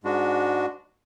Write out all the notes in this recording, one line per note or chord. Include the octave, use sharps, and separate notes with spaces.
G#2 G#3 D4 F#4